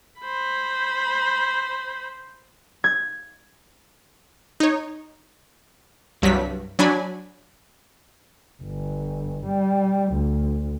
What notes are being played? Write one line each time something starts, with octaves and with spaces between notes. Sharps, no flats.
C5 B5
G#6
D#4 C#5
C2 G2 F#3 B6
F#3 D4 G#5 B5
G1
G3
D2